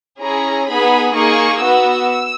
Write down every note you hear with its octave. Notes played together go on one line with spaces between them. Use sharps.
C#4 E4 G#4 A#5
B3 D#4 G#4 B5
A#3 D#4 G#4 C#6
B3 F#4 E6